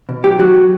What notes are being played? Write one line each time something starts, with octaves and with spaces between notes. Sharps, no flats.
B2
F#3 G4
F#3 F#4
F#3